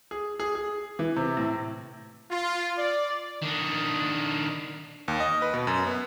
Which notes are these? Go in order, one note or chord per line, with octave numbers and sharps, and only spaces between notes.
G#4
G#4
G#4
E3
C3
A2
F4
D5
D#3 D4
D#2
D#5
B4
B2
F#2
B3